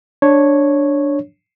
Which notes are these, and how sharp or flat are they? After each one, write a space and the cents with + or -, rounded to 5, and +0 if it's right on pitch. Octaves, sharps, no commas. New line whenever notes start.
D4 -5 C#5 -5